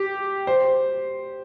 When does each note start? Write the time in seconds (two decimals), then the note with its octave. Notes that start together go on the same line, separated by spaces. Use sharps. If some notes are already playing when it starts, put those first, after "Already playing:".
Already playing: G4
0.47 C5